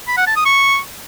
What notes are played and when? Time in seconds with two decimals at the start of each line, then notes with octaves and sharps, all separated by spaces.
0.08 B5
0.17 F#5
0.27 A5
0.36 D#6
0.46 C#6